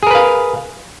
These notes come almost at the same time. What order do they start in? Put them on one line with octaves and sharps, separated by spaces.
G#4 A#4 B4 F5